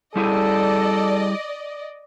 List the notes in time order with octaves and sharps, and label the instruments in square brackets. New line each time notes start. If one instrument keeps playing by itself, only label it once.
[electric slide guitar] G3 E4 G#4 [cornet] A4 [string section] D5 D#5